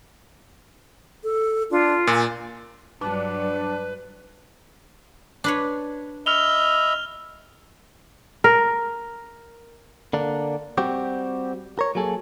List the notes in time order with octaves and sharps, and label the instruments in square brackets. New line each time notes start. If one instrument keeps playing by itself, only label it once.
[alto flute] A4
[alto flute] D4 [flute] F4
[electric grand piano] A#2 [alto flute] G#5
[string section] G2 F#3 [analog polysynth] D4 [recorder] B4
[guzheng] D4 B4 C#5
[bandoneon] D#5 E5 B5 [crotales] F6 F7 G7
[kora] A#4
[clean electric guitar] D3 A#3 D4
G3 C4 F#4 G4
A#4 C#5
F#3 A#3 G#4 A4